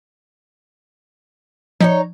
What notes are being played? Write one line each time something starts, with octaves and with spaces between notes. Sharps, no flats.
F3 D#4 E4 C#5